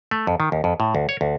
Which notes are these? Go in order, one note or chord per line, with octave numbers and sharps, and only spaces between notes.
A3
F2
D#3
D#2
F2
A2
D2
C#5
D2